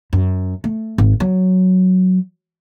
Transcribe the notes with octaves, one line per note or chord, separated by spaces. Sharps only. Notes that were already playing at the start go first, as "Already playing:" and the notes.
F#2
A3
G#1
F#3